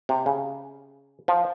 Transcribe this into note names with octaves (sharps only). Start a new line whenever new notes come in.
C3
C#3
F3